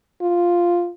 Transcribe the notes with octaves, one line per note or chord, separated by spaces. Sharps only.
F4